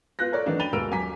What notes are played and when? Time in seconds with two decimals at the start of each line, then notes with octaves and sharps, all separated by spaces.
0.19 B3 F4 F#6 G6 A#6
0.32 A4 A#4 C#5 D5
0.46 E3 F#3 A3 D4 D#4 F#4
0.59 G5 B5 A6 D#7 F7 G7
0.73 D#1 B2 G#3 A#4 E6 D7
0.91 D#1 F#2 G#5 A#5 D6 B6